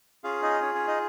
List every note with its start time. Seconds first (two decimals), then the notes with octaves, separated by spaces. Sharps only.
0.24 C#4 F4 G#4 F5
0.42 D#4 D#5
0.61 C#4 C#5
0.75 C#4 C#5
0.87 D#4 D#5